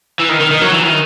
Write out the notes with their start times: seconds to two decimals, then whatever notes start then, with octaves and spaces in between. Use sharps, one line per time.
0.20 E3
0.29 D#3
0.41 D#3
0.51 D#3
0.61 F#3
0.72 E3
0.83 D#3